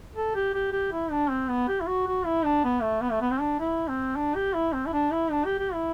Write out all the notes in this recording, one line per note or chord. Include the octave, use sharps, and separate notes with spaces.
A4
G4
G4
G4
E4
D4
C4
B3
G4
E4
F#4
F#4
E4
D4
B3
A3
B3
A3
B3
C4
D4
E4
C4
D4
G4
E4
C4
E4
D4
E4
D4
G4
G4
E4